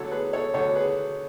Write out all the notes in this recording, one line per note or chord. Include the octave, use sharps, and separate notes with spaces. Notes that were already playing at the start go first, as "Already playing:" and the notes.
Already playing: D2 D3 F#3 A4 C#5
G#4 B4
A4 C#5
D2 D3 F#3 A4 C#5
G#4 B4